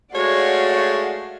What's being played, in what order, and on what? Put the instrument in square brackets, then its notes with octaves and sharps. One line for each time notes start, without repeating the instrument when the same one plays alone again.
[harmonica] G#3 A3 [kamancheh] F#4 [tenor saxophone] C#5 [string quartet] D5 F5 F#5